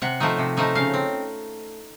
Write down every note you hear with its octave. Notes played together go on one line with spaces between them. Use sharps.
C3 F#5
F3 A3 D#4
C3
F3 A3 D#4
C#3 F5
C4